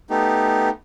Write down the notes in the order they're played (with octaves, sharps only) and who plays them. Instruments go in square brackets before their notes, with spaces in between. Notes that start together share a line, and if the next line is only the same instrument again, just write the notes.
[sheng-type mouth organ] A3 B3 D#4 G4